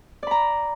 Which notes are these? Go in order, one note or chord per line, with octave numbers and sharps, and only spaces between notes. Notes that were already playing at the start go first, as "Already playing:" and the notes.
D5 A#5 B5